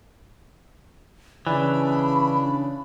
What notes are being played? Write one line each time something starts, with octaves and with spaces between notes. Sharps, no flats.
C#3 E3 D4 B5